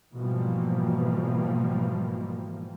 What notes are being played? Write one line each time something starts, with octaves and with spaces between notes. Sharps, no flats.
G#2 B2 E3 F3 G3 A#3